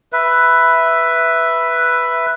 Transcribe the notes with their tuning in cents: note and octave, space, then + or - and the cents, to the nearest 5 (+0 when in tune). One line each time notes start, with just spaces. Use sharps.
B4 +0 E5 +5